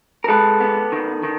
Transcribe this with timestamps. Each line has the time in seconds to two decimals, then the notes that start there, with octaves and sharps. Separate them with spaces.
0.24 A#4
0.28 G#3 A4 B4
0.60 B3
0.92 D#3
1.23 D#3